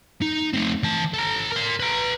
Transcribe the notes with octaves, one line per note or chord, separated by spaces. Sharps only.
D#4
A3 C4
E3 A5
A4 A#5
A#4 C6
B4 A#5